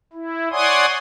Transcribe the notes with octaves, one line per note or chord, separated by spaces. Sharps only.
E4
C#5 D5 F#5 G#5 C6 D#6